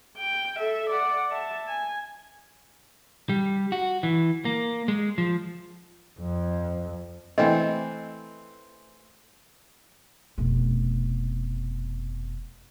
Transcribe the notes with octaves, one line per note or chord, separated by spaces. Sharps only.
G5
A4 E5
D5 F#5
E5 A5
G#5
G3
F#4
E3
A#3
G#3
F3
F2
E3 A3 C4 D#5 G5
F1 B2